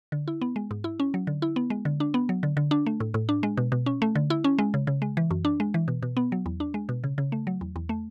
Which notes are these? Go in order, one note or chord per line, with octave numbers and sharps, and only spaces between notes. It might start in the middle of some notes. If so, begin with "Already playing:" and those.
D3
E4
B3
G#3
G#2
E4
C#4
F#3
D3
E4
B3
G#3
D3
D4
B3
F#3
D3
D3
D4
A3
A2
A2
D4
G#3
B2
B2
C#4
A3
D3
E4
C#4
G#3
C#3
C#3
G#3
E3
F#2
D4
G#3
E3
B2
B2
B3
F#3
E2
D4
G#3
B2
C#3
C#3
A3
F#3
E2
E2
A3